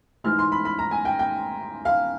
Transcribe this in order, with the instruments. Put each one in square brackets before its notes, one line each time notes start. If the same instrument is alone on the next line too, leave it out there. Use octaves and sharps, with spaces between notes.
[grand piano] G#2 E3 G#3 F6
C6
B5
B5
A#5
G#5
G5
G5
F5